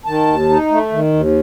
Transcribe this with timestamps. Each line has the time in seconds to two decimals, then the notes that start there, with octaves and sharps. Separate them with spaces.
0.06 D#3 A5
0.27 D#2
0.49 D#4
0.71 A3
0.92 D#3
1.13 D#2